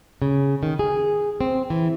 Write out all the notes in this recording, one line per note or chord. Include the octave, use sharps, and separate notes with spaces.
C#3
D#3
G#4
C4
E3